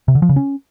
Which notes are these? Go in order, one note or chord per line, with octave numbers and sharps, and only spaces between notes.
C3
D3
F3
C#3
C#4